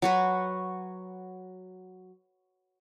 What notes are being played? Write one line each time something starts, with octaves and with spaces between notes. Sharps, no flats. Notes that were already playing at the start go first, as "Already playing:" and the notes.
F#3 F#4 B4